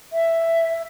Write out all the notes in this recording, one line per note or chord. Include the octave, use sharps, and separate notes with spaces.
E5